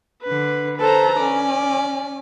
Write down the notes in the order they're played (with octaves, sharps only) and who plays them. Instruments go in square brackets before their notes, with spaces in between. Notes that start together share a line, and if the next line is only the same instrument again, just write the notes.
[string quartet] D3 B4
[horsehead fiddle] A4 [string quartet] B4 C5 A#5
[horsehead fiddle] C#4 [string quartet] D5